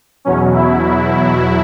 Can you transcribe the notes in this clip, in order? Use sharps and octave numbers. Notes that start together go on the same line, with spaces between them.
E2 B2 F#3 C#4
E4